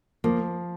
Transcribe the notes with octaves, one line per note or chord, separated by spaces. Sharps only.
F3 A#3